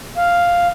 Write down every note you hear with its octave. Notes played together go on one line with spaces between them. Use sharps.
F5